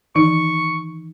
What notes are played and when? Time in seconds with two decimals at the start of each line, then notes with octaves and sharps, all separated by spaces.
0.15 D#3 E3 D#4 C#6